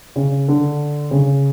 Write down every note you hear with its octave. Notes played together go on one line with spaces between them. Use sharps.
C#3
D3
C#3